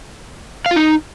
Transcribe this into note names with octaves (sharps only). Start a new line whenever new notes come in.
F5
F4
D#4